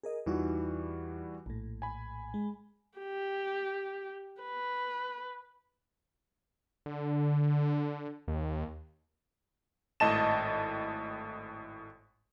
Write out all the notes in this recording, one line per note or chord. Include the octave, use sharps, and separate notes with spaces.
G#4 A#4 D#5
E2 E3 G3 D#4 F4 F#4
A#1 A2
G#5 B5
G#3
G4
B4
D3
D#2
G#1 A2 D#5 A5 E7